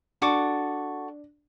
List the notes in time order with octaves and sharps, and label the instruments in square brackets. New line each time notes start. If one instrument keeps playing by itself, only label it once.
[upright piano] D4 [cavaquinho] F#4 A4 D6